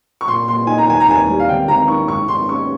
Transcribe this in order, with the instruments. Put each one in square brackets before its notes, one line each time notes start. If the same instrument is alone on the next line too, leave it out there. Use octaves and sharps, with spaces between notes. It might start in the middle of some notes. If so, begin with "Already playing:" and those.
[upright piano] C#6
A#2 C6
A#2 C6
D#4 G#5
A#5
D#2 G#5
A#5
D#2 G#5
G3
F5
G#1 G5
G#1 A#5
D#3 C#6
G#2 C#6
G#2 C6
C#4 C#6